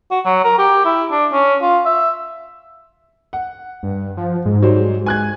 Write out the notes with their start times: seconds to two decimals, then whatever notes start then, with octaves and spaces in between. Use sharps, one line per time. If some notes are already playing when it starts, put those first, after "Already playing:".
0.11 F#4
0.25 F#3
0.44 A#4
0.59 G4
0.85 E4
1.11 D4
1.32 C#4
1.62 F4
1.85 E5
3.33 F#5
3.83 G2
4.17 F3
4.45 G#2
4.62 F#3 G3 C5
5.06 G#5 F#6 G#6